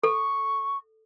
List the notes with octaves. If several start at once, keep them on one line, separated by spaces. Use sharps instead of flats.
A4 C#6